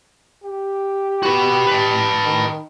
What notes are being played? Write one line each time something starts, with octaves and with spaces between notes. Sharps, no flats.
G4
F#4 B4
B4 A5
D#3